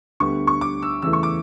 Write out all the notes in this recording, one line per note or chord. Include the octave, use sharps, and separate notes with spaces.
D2 D3 G3 B3 C#6
C#6
D6
E6
E2 C#3 E3 A3 E6
C#6
D6